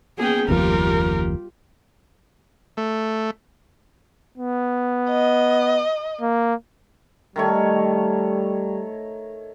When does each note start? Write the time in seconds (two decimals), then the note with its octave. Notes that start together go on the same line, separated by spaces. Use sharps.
0.18 A#3 B3 C#4 G#4 G5
0.48 F#1 D#2 F3 G3 F4 G4 A#4
2.77 A3
4.38 B3
5.10 D#5
6.22 A#3
7.36 D#3 G3 A3 C#5